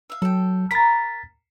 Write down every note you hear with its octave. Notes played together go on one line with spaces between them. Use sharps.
E5 F5
F#3 A4 G5
A#4 A#5 B5 A6 B6